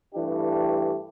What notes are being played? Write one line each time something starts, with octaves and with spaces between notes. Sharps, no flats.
G2 E3 A3 D4 G4